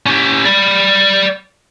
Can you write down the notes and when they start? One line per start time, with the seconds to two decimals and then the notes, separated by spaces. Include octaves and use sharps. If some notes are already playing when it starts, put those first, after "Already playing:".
0.06 C#4 G4
0.45 D5 B5